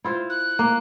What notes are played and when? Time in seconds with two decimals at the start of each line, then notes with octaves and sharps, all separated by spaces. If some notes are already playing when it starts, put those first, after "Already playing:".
0.04 E4 F4 C5
0.30 F#6
0.59 A#3